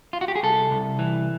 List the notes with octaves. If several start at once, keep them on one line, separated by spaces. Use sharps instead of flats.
F4
F#4
G4
G#4
C2 A4
C2
E3